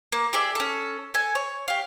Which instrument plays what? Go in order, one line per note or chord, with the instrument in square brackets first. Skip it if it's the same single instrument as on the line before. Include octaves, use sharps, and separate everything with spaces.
[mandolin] A#3
G4 G#4 D5 E5
C#4 A4
A4 G#5
C#5
G4 F5